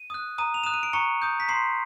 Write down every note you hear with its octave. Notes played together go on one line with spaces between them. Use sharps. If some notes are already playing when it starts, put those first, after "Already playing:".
Already playing: D#7
D#6 F#6
A#5 D#6 D#7
F7
D#6 F#6 E7
D#7
D7
A#5 C#6 C#7
D#6 G6
B6
A#5 C6 C7